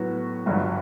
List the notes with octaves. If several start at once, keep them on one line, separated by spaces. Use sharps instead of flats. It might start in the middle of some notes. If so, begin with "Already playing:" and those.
Already playing: A2 F#3 B3 F#4
G1 G2 F#3